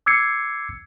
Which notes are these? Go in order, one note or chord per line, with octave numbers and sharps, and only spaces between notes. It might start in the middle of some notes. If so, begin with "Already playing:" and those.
D6 E6 G#6 C7 C#7